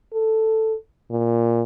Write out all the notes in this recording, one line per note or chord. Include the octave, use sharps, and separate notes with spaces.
A4
A#2